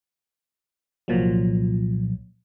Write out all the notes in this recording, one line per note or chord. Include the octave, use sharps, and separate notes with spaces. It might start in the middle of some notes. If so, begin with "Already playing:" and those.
C2 A#2 F3 F#3